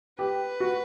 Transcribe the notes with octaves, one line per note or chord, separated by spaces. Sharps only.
G4 B4
F#4